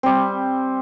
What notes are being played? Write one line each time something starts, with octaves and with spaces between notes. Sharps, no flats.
G3 C4